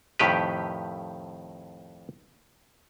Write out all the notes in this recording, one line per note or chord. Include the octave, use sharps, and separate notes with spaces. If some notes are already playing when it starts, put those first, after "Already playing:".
F2 A2 D#3 G4 B4